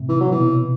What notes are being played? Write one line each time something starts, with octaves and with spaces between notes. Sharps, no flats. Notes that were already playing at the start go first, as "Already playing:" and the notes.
Already playing: A2 C3
E3
F#3
E3
B2